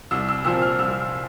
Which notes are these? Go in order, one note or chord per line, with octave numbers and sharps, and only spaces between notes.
C2 E6
E6
A#2 F3 C4 E6
F6
C2 E6